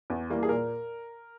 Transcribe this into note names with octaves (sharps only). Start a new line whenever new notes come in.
E2
E3 G3 A#3
G#4
A#2 A#4